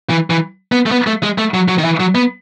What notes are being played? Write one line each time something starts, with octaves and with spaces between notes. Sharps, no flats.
E3
E3
B3
A3
B3
A3
G#3
A3
F#3
F#3
D#3
E3
F#3
B3